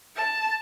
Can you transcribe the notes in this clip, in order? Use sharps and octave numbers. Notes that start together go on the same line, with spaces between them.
A5